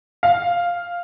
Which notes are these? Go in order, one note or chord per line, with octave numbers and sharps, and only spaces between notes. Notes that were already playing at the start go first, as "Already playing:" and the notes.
F5